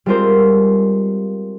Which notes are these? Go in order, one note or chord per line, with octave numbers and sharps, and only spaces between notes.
G3 G#3 C4 F4 A#4 C5